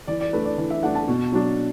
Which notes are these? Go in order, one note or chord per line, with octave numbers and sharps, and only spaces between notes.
E3 D5
D5
A3 D4 B4
D5
E3
E5
A3 D4 F#5
A5
B2
F#3 D4